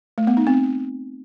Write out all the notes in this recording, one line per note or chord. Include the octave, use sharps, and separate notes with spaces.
A3
B3
D#4
C4